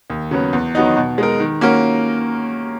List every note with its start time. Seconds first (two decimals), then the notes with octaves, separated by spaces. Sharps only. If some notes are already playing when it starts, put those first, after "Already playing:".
0.10 D#2
0.31 C#3 F#3 B3
0.53 E2
0.75 D#3 F#3 B3 D#4
0.97 B2
1.18 G#3 D#4 A#4
1.40 D#3
1.61 A#3 C#4 F#4 A#4